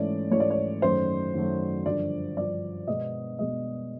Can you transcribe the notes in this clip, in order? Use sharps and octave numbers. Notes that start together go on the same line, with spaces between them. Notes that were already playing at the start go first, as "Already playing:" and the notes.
Already playing: G#2 E3 A3 C#4 D5
G#2 E3 A3 C#4 C#5
D5
C#5
F#2 D#3 F#3 A3 C5
F#2 D#3 F#3 A3
G2 D3 F3 D5
G2 D3 F3 D5
B2 G#3 B3 D#5
B2 G#3 B3 D#5